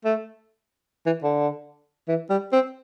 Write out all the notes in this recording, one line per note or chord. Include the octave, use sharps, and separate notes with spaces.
A3
E3
D3
E3
G3
C4